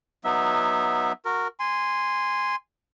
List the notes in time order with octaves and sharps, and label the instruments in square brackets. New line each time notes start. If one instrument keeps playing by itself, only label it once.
[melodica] F#3 B3 D#4 E5
F#4 A#4
G#5 C6